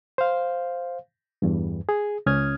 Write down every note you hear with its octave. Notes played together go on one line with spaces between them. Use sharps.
C5 F5
E2 G2
G#4
C#2 C#4 D#6 F6 G#6